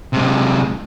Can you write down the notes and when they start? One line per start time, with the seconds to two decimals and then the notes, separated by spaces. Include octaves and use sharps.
0.13 C3 G#3